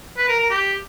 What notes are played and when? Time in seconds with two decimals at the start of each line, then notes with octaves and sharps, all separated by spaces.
0.18 B4
0.29 A#4
0.39 A#4
0.50 G4